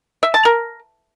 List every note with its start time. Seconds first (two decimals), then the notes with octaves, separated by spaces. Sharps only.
0.23 E5
0.34 A5
0.45 A#4